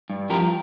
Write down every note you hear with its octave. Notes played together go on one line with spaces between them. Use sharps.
G2
F3 G4 A#4